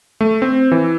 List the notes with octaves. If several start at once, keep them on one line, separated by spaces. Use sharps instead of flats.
A3
C4
E3